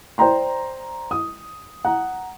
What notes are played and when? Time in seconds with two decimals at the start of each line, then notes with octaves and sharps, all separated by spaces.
0.18 C5 D5 G5 A#5 C6
1.11 D#6
1.85 F#5 A#5